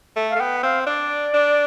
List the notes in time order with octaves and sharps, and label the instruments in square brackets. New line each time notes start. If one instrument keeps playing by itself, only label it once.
[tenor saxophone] A3
[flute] F5
[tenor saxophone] A3
[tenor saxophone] B3 [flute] G5
[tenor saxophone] C4 [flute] F5
[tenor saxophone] D4 [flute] D5
[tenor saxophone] D4